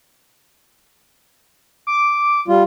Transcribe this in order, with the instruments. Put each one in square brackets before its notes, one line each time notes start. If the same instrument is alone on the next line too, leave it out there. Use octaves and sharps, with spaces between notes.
[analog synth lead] D6
[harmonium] G3 F4